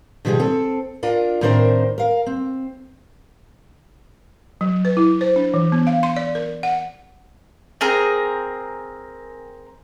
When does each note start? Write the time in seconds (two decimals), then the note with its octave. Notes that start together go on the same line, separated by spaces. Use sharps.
0.25 B2 D#3 F3 G3 G4 G#4
0.40 C4 A4
1.03 D4 F4 A#4
1.41 A2 D#3 C4 D4 A#4 C5
1.98 A#4 F5
2.26 C4
4.61 F#3
4.85 B4
4.97 E4
5.21 C5
5.36 D4
5.54 E3
5.72 B3
5.87 F5
6.03 C6
6.16 D5
6.35 A#4
6.63 F#5
7.81 C4 G#4 A#4 A#5